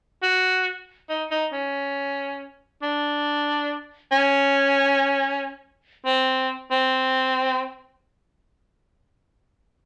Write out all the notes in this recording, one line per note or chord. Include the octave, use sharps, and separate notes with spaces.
F#4
D#4
D#4
C#4
D4
C#4
C4
C4